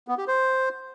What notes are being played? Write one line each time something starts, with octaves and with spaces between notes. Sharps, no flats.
B3
G4
C5